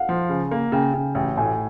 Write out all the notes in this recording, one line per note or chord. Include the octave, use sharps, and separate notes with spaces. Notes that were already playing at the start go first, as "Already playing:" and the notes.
Already playing: F5 F#5
F3
C#3
A#3
C#3 G5
C#3
A1 G5
A2 G#5